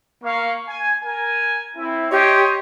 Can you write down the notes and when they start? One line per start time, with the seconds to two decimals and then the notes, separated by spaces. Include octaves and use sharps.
0.24 A#3 F5 C#6
0.67 G#5
1.03 A#4 G#5
1.77 C4 E4
2.11 G4 C#5 D#5 C6